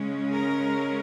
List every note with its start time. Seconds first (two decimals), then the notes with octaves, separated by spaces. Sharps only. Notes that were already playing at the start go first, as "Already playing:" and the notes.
Already playing: C#3 G#3 C#4
0.32 A#4